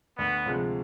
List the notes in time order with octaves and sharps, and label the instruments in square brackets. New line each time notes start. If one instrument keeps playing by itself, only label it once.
[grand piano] D2 [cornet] B3
[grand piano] C3 F3 G#3